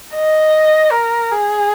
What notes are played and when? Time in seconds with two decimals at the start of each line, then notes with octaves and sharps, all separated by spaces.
0.15 D#5
0.92 A#4
1.32 G#4